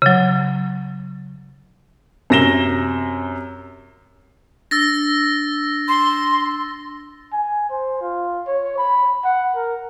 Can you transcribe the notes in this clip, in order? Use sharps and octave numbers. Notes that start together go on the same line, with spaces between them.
C#3 F#3
F#2 C3 A#6 E7 G7
D4 E6 A6 A#6
C6
G#5
C5
F4
C#5
B5
F#5
A#4